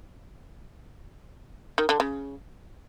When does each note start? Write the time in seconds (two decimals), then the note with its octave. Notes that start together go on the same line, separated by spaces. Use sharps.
1.78 D#3
1.89 D3
2.00 C#3